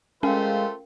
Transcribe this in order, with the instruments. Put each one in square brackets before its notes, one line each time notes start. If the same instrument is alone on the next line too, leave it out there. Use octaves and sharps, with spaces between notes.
[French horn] G#3 [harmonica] A3 F4 C5 [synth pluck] C#4 [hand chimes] A#4 F5 G5